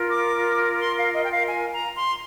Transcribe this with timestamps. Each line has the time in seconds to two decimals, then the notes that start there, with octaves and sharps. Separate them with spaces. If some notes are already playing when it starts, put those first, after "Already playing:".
Already playing: F4 A#4
0.10 D6
0.80 C6
0.97 F5
1.14 D#5
1.23 G5
1.31 F5
1.49 G#5
1.73 A#5
1.96 C6